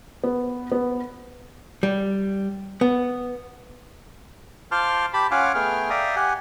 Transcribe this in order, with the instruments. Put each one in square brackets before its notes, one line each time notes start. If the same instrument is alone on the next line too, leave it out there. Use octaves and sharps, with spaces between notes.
[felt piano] B3
B3
[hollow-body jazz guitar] G3
B3
[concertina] F4 C5 A5 C6 D6 F6
G4 A5 B5
C#4 F4 F5 F#5 G#5 D6
A3 B3 G#4 G5 F6
D5 E5 F5 G5 A#5 D#6
G4 F#5 G#5